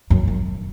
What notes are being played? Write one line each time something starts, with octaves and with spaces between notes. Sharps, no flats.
F#2
F#2